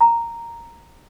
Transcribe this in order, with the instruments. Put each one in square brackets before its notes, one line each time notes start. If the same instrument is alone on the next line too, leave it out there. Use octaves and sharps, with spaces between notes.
[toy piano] A#5